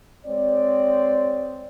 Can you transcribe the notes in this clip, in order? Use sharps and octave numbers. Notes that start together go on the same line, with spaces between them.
G#3 C4 C#5 D5